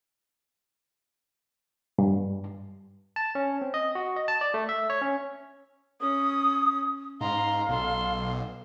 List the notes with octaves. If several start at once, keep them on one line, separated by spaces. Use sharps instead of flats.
G2
A5
C#4
C4
D#5
F#4
D#5
A5
D5
A3
E5
C#5
C#4
C#4 D#6
G#2 F5 A#5 C6
B1 A4 C6